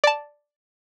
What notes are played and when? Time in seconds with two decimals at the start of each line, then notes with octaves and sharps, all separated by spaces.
0.04 D5 A5